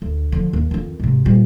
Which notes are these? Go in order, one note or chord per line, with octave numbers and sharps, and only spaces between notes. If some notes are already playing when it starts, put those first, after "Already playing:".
D2
D3 F3
D#2
F2 D#3
G#2 C3
A#2 G3